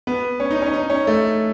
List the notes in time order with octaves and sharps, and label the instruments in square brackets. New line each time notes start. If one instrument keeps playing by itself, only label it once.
[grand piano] B3
C#4
D#4
C#4
D#4
C#4
A3